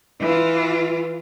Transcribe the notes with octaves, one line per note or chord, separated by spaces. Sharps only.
E3 F4